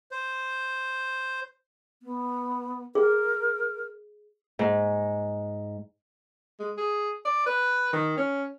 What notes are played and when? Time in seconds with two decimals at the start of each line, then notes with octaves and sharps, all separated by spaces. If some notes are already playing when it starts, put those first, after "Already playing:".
0.11 C5
2.03 B3
2.95 G#4 A#4
4.59 G#2
6.60 G#3
6.78 G#4
7.25 D5
7.46 B4
7.93 D#3
8.17 C#4